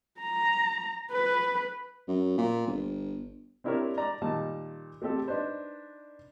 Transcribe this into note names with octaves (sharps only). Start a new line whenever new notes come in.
A#5
B4
F#2
A#2
G1
C4 D4 E4 G4 A#4 C#5
D5 A#5
A#2 D#3 G3 A5
A3 C4 G4 A4
D4 D#4 B4 C5